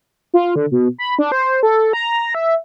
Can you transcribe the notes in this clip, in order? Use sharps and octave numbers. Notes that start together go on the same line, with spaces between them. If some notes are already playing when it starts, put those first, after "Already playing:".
F4
D3
B2
B5
D4
C5
A4
A#5
E5